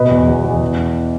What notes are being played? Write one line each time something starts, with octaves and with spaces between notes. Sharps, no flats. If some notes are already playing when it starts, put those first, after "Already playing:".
Already playing: B2 B4 D#5
E2
E2
E2
E3